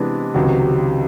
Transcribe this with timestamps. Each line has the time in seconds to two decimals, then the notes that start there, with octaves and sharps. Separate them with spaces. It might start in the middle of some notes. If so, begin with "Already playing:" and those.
Already playing: C3 E3 G#3 B3 D4
0.34 C#2 C3 D#3 F#3